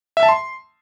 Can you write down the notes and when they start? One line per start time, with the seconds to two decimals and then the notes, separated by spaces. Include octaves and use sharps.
0.17 E5
0.23 A5
0.29 C6